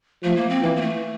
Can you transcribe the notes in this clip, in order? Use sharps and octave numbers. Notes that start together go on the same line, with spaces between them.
F3 A3
A#3
C4
E3 A#3
A#3
A3